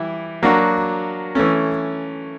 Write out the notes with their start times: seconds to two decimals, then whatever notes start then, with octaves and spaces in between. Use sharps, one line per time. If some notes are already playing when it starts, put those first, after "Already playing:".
Already playing: E3 G3 E4
0.43 F#3 A#3 D4 F#4
1.35 E3 A3 C#4